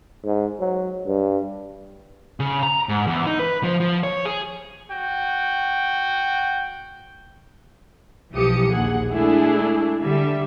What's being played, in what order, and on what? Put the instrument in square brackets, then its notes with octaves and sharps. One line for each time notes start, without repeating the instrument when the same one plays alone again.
[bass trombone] G#2
F#3
G2
[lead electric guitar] C#3
A#5
G#2
E2
D#4
B4
F3
F3
C#5
G#4
[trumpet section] F#4 G5
[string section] B1 E3 F3 G4 D#6 C#7
A#1 D#2 G#4 F#5
G#3 A3 D4 E4 G#4 A4
D3 G3 E5